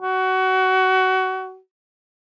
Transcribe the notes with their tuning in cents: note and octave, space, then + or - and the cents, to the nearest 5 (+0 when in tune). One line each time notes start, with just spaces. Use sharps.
F#4 +20